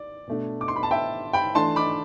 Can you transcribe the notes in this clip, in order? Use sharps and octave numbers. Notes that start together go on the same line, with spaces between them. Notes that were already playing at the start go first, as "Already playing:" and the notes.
Already playing: D5
B2 A3 D4
D6
C6
B5
A5
E5 G5
G5 B5
E3 A3 D4 A5 C6
B5 D6